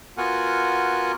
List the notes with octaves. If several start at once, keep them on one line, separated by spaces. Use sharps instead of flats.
B3 F4 F#4 A#4 F#5 G#5